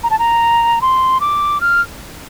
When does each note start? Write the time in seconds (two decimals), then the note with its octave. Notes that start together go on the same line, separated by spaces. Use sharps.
0.03 A#5
0.10 A5
0.19 A#5
0.82 C6
1.20 D6
1.61 F6